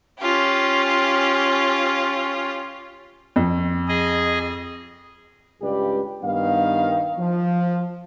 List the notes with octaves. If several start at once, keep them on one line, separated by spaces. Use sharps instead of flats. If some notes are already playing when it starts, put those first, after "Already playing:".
C#4 F4 G4
F2
G#4 D#5
C#2 G2 G4 B4 D5
G2 D#3 B3 F5
F3